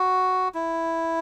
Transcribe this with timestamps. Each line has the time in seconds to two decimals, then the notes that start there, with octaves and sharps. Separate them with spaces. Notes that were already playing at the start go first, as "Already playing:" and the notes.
Already playing: F#4
0.54 E4